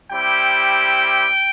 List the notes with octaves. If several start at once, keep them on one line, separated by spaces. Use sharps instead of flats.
G3 C4 E4 G4 G5